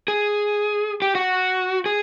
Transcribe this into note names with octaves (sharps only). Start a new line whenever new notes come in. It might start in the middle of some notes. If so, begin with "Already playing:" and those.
G#4
G4
F#4
G#4